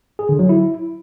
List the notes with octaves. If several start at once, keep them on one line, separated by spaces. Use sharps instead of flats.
G#4
D3
F#3
E4